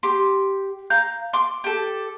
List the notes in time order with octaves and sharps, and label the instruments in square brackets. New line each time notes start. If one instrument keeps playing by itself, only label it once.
[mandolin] G4 C6
F5 A#5 G6
C6 D6
G4 A4